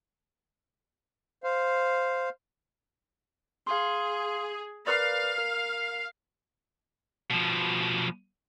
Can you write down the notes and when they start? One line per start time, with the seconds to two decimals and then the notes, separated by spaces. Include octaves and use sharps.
1.44 C5 F5
3.67 G#4 F5 C6
4.87 A#4 B4 D5 F5
5.38 A#4
7.30 B2 F3